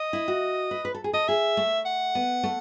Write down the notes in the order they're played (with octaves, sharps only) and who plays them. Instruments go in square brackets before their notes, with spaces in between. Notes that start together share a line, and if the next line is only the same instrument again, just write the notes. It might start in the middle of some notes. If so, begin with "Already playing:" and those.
Already playing: [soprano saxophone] D#5
[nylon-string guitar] E4
F#4
B4
B4
A4
G#4
[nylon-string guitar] A4 [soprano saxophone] D#5
[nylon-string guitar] G#4 [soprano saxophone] E5
[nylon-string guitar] A3
[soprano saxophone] F#5
[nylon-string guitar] B3
A3